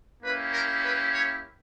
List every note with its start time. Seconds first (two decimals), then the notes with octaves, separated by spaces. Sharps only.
0.23 A#3 C#4 E4 G4 B4
0.53 A#4
0.83 B4
1.13 C#5